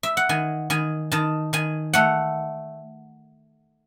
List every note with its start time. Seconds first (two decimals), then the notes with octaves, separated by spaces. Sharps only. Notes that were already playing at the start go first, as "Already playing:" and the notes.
0.03 E5
0.17 F#5
0.29 D#3 G#5
0.70 D#3 G#5
1.12 D#3 A5
1.53 D#3 G#5
1.93 A3 F#5